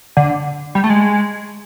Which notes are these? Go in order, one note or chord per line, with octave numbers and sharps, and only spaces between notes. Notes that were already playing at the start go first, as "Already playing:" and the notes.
D3
G3
A3
G#3